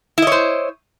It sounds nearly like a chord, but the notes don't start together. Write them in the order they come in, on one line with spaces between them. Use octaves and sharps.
E4 D#5 C#5 C5